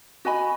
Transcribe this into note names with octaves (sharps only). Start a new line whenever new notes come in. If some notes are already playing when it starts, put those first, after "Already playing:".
F#4 D#5 G#5 B5